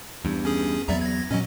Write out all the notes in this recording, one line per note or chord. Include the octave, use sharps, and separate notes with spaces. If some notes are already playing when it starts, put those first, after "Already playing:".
E2 G2
C#4 G#4
E2 F#3 B3 D5 E5 A#5
G#6 A#6
A#2 F#3 C#4 D#5